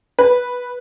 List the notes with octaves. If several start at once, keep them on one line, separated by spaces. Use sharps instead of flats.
B4